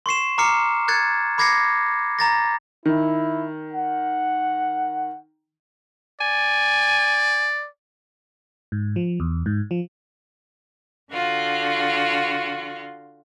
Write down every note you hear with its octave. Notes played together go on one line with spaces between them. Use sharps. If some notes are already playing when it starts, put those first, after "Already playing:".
C6 C#6 C7 E7
A#5 D6 F6 C7 C#7
F#6 G#6 A6 C#7
B5 D6 G#6 A#6 C7 C#7
A#5 A6 A#6
D#3 E4
F#5
D5 G#5
G#2
F3
E2
G#2
F3
D3 F4 F#4